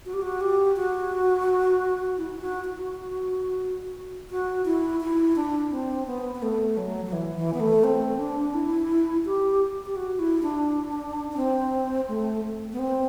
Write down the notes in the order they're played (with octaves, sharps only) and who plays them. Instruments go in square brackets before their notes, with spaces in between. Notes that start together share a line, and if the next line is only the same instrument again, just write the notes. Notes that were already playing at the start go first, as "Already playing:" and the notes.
[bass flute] F#4
G4
F#4
G4
F#4
E4
E4
F#4
F#4
F#4
E4
E4
D4
C4
B3
B3
A3
F#3
F#3
E3
E3
B3
A3
C4
D4
E4
G4
G4
F#4
E4
D4
D4
C4
A3
B3
C4